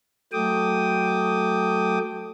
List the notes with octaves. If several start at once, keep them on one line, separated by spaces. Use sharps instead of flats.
F#3 A3 G5 D6 D#6